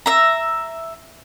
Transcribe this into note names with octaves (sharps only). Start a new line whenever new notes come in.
E5 A#5